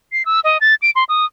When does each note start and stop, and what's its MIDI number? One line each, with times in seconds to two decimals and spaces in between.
0.12 0.25 96
0.25 0.40 88
0.44 0.58 75
0.61 0.74 93
0.82 0.90 98
0.96 1.04 84
1.09 1.25 87